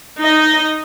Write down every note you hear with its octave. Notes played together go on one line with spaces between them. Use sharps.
D#4 D#5